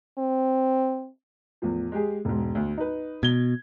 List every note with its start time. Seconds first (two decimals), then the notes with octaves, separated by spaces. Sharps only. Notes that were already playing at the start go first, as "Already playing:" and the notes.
0.18 C4
1.62 E2 A2 F3
1.92 G#3 G4 G#4
2.25 E1 G#2
2.55 D2
2.77 D#4 B4
3.23 B2 G#6 G7